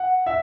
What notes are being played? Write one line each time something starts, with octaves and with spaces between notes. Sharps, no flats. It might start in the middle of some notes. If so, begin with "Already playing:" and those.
Already playing: F#5
E5